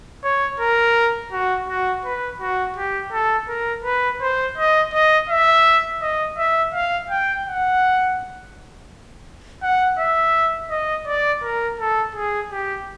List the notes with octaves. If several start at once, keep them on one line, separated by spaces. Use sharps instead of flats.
C#5
A#4
F#4
F#4
B4
F#4
G4
A4
A#4
B4
C5
D#5
D#5
E5
D#5
E5
F5
G5
F#5
F#5
E5
D#5
D5
A#4
A4
G#4
G4